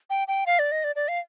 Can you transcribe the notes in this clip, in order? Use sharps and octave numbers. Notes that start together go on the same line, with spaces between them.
G5
G5
F5
D5
D#5
D5
D5
F5